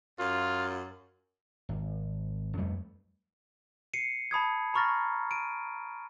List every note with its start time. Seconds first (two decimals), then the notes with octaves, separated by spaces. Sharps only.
0.19 F#2 F4
1.69 G#1
2.58 F2 G3 A3
3.94 C7 C#7 D#7
4.31 A5 B5 D#6 G#6
4.74 A#5 B5 C#6 F6 A6 A#6
5.31 D7 D#7